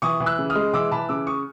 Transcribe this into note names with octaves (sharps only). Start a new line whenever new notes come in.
E3 C#6 D#6
E3
E6 F#6
C#3
D#6 F6
G#3
E3 D6 E6
E3 A5 B5
C#3 D6 E6
C#6 D#6